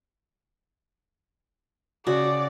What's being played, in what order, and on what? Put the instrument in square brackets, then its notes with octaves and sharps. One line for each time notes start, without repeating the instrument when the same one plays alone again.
[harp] C#3 [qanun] F#4 [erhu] D5